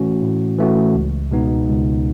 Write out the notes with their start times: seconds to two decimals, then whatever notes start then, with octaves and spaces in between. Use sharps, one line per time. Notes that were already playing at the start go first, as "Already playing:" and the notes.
Already playing: A2 E3 A3 C#4 F#4
0.23 A2
0.59 E3 A3 C#4 F#4
0.95 C#2
1.31 B2 G#3 B3 D#4
1.68 C#2